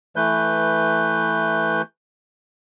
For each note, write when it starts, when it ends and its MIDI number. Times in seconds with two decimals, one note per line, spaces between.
0.16 1.82 52
0.16 1.82 57
0.16 1.82 71
0.16 1.82 91